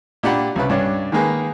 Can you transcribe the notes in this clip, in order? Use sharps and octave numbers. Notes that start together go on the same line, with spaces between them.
A#2 D4 G4 F#5 B5
C2 C#3 B4
G2 C#4 D4
D#3 G#3 A#3 G#4 B4